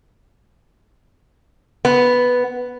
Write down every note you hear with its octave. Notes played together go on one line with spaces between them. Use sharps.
B3